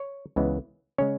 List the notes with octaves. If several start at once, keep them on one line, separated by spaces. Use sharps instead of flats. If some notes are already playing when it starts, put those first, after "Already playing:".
Already playing: C#5
C#2 C#3 E3 G#3 B3
C#3 G#3 C#4 C#5